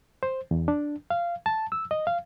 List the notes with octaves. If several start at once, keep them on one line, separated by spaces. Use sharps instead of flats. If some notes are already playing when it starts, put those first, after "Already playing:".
C5
E2
D4
F5
A5
E6
D#5
F5